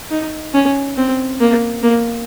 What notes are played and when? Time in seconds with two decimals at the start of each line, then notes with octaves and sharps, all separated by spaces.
0.11 D#4
0.54 C#4
0.97 C4
1.40 A#3
1.83 A#3